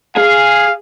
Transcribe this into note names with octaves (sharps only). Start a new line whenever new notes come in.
G#4 F5